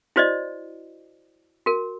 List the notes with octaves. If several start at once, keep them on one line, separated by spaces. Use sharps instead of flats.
E4 F#4 C5 D5 D#5
F#4 A#4